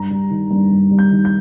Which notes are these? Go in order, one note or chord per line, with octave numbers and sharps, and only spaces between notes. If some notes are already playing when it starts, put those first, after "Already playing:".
Already playing: G2 A#5
G3
D#3
G2
G2
G3
G6
D#3
G6